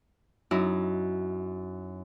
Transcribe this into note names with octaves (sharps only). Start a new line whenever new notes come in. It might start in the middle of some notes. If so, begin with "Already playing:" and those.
F#2 D#4 E4 D#6